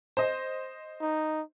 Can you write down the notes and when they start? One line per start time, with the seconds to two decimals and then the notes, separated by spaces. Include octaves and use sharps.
0.17 C5 D#5
1.01 D#4